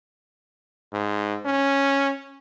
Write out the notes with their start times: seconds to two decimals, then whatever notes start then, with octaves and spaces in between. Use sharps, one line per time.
0.93 G#2
1.46 C#4